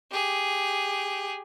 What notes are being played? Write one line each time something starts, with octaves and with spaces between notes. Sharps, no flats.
G4 G#4